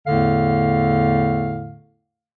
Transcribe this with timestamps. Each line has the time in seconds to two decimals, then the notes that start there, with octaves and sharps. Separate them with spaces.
0.07 E2 A2 D3 A3 F5